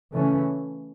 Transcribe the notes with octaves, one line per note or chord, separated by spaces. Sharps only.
C#3 E3 A3 C#4